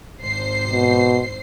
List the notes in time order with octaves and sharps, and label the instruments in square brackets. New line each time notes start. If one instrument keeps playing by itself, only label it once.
[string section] G#1 C5 C7
[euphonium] B2